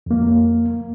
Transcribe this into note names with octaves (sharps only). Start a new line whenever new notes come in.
F2 A#3